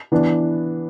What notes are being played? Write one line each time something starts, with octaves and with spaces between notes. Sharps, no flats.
E3 B3 D4